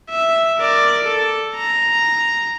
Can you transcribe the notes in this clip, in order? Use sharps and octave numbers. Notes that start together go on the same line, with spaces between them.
E5
A#4 D5
A4
A#5